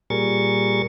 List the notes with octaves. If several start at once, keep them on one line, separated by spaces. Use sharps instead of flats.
A#2 G3 G#4 A#4 C#6 A6